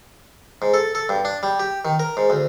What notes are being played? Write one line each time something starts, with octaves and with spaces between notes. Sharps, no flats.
G#2
A4
A4
G2
D4
G3
G4
D#3
A#4
G#2
D2